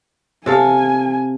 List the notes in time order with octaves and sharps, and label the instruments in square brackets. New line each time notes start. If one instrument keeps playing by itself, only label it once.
[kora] C3 A4 F5 [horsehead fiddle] G#5